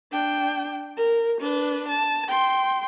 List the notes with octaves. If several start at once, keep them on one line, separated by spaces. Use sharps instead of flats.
D4 G5
A#4
D4 B4
A5
G5 C6